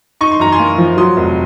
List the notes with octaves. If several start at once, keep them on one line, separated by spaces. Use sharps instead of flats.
D#4 C#6
C6
F#2 A#5
G#5 C6
A#3
F3
F#3 C6 D#6
F1